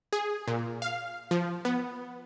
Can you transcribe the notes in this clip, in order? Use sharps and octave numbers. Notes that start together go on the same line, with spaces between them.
G#4
A#2
F5
F3
B3